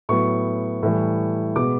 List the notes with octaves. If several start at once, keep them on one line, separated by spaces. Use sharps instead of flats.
A2 F#3 B3 C#6
A2 E3 G3
B2 G#3 B3 D6